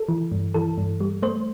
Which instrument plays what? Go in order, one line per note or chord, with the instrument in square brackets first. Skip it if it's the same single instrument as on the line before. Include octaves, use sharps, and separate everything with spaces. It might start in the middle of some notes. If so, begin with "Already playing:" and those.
Already playing: [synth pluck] A4
E3
G2
E3 A4
G2
G3
A3 C5